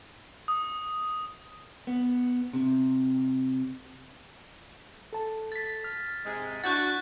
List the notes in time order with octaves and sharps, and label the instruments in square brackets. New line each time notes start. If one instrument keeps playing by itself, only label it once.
[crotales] D#6
[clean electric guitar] B3
C3
[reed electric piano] A4 A5
[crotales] A6 B6
[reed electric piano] F6
[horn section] G#2 C3 G#3
[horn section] D4 E4 F#4 [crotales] F#6 G6 A6